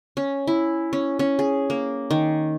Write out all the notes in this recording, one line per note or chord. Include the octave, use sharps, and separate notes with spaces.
C#4
E4
C#4
C#4
G#4
A#3
D#3